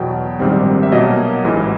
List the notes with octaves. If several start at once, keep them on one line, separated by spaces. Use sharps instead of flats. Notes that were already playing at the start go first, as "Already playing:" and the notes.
Already playing: E2 B2 F#3 B3 G5
A#1 G#2 D#3 G3 C4
E5
B2 F#3 A#3 D#5
A1 G#2 E3